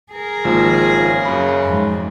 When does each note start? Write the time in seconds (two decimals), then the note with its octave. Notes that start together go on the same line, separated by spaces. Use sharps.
0.12 G#4 A#4
0.45 G#1 F3 A#3
0.94 C#3
1.25 F#2 B5
1.64 F2 G#2